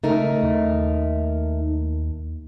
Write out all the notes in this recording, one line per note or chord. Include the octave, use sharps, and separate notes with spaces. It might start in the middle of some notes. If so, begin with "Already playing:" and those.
C#3 A3 D#4 A#4
D#2